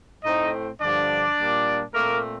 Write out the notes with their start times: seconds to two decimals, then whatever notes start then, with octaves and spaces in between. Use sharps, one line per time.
0.23 A2 A3 C4 D#4 D#5
0.81 G2 D3 F3 D4 D5
1.37 A#2 G3 A#3
1.93 A#2 A3 A#3 C4 A#4